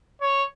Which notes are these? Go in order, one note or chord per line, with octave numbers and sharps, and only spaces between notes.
C#5